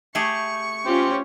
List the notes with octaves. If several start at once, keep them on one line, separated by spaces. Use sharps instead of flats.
A3 G4 G#4 C#6
C#4 F4 G4 C5